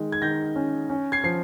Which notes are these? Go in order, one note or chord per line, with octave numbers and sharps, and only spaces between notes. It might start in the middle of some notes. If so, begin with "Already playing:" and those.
Already playing: D#3 G#3
G#6
D#3 G6 A#6
C#4
C#4
G#6 C7
F3 C7